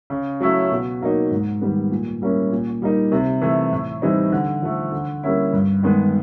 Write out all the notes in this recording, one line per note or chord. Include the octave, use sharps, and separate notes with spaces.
C#3
F#3 A3 C#4 E4
B2
F#3 A#3 D#4
G#2
D#3 G3 B3
A#2
G3 A#3 C#4 E4
A#2
G3 A#3 D#4
C3
E3 A3
A2
E3 G3 C4 D#4
D3
F3 A3
D3
G3 A#3 C#4 E4
G2
D#3 G#3 B3